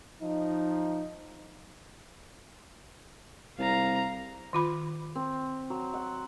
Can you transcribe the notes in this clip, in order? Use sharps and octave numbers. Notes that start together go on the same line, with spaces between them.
F3 D#4
C2 F5 A#5
D#3 F4 B5
C4
F#3
F#5